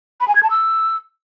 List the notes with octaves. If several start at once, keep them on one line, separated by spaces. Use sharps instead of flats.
B5
G#5
G#6
A5
E6